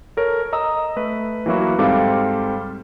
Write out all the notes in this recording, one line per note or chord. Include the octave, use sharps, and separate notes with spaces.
A4 A#4 C#5
D#5 A#5 D#6 E6
A3 B4
E3 F#3 A#3 E4 F#4
G#2 G3 C4 A4 F5 D6